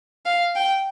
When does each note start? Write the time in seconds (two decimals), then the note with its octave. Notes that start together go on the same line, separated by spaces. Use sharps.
0.25 F5
0.55 G5